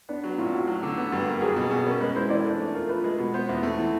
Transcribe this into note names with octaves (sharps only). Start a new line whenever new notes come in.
B3 D4
F#3
A2 F4
A2 F#4
F#3
D3
B3
G2
A#3
F#3 G#4
B2 G#4
B2 G#4
C#4 A#4
G#3 B4
E4 C5
E3 D5
D4 A4
A3
F4 A#4
F3 B4
G#3
B2
B3 C5
E2
A3
E3